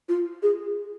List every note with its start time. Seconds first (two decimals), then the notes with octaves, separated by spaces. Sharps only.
0.09 F4
0.43 G#4